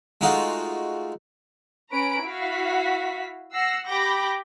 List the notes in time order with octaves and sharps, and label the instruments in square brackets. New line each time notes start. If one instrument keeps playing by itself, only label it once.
[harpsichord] G#3 A3 D#4 F4 F#4
[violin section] C#4 B4 A#5 B5 D7
E4 F#4 F5 B6
F#5 E6 A#6 C7
G4 B5 D6 G6 A#6